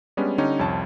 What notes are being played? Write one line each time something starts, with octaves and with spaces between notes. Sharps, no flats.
G3 G#3 B3 C#4 D4
D3 G3 C#4 D#4 G4
C2 F2 C#5 A5